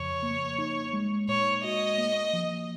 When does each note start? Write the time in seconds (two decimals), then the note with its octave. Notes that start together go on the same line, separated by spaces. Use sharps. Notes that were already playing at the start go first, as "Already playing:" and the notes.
Already playing: F2 C#3 F3 C#5
0.23 A#3
0.58 D#4
0.93 G#3
1.28 A#2 C#5
1.64 F#4 D#5
1.98 A#3
2.33 F3